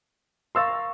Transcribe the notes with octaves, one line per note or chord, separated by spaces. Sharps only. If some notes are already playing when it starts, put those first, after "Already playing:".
A#4 C#5 F5 C6 E6 A6